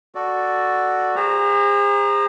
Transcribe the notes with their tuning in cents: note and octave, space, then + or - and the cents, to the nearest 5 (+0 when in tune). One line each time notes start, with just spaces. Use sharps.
F#4 +0 A4 +0 D5 +0
G#4 -40 C5 +0 A#5 +0